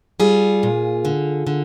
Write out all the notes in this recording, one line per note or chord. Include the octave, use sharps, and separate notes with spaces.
G3 F4 G#4
A#2
D3
D3